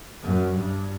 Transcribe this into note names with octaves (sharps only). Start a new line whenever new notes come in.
F#2
G2